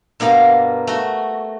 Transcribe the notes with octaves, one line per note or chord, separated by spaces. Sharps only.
G2 B2 A#3 A#4 F5
A3 F#4